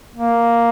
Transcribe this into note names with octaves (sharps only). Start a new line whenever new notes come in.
A#3